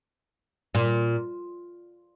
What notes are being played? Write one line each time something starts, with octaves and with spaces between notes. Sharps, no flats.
A#2